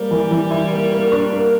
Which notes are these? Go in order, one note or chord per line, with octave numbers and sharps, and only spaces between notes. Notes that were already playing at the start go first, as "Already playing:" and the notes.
Already playing: G3 A#3
E3
E3
E4
A#3
A#3
D4
A#3